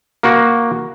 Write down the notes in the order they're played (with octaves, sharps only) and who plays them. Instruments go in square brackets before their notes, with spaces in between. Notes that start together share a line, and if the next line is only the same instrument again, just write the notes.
[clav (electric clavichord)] A#3 F#4